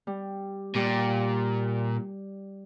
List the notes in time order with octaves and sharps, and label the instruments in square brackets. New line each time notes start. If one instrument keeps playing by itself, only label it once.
[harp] G3
[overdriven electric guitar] A#2 [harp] G3